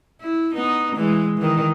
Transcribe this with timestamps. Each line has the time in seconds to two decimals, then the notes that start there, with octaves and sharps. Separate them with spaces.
0.21 E4
0.54 B3 D#4
0.95 E3 G#3
1.38 D#3 E3